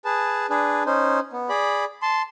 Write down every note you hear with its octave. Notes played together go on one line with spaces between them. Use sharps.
G#4 B4 A5
D4 G#4 B4
C#4 D#4 C5
B3
G#4 D5 B5
A5 C6